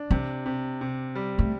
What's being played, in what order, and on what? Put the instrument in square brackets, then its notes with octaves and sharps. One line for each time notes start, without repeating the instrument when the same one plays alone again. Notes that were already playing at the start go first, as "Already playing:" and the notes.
Already playing: [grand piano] D4
[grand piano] C3 [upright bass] C4
[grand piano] C3
C3
G3
[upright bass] A3